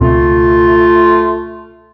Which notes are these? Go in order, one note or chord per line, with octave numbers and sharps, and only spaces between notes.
C#2 B2 A3 C4 F4